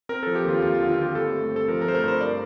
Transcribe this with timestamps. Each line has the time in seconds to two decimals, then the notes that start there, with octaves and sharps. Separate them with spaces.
0.09 C4 A#4
0.23 F3 A4
0.35 G4
0.45 D#2 F4
0.62 D#2 F4
0.75 F4
0.80 D3
0.89 F4
0.98 C4 G4
1.15 G2 A4
1.33 A3
1.50 C4
1.56 A4
1.68 F3 A#4
1.82 A#4
1.86 A3 C5
1.94 A#4
2.04 G2 C5
2.21 D5